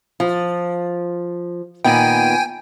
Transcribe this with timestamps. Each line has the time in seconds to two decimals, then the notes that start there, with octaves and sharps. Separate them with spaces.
0.20 F3
1.85 A#2 D#3 B3 G5 G#5